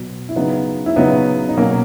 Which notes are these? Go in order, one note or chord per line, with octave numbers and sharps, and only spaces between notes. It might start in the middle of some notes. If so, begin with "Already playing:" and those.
Already playing: B2 F#3
E4
C#3 F#3 B3 D#4
E4
C#3 F#3 B3 D#4
D#4
B2 F#3 A#3 C#4